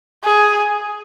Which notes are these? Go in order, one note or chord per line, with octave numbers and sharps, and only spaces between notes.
G#4